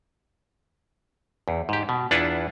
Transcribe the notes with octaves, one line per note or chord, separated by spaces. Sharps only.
E2
G#2 G4
B2
E2 D4 E4 F4 B4 F#5